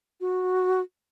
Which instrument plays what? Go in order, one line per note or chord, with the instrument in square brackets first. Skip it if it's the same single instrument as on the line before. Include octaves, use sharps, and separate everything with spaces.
[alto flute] F#4